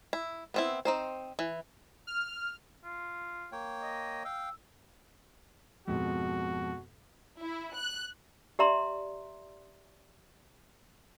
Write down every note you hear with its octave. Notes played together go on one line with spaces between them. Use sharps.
E4
B3 C4 E4
C4 D#4 C5
E3
F6
F4
A#3 C#5 G5
D#5
F5 G5 E6
F2 G#2 B2 F#4
E4
F#6
G4 D5 E5 A#5 C6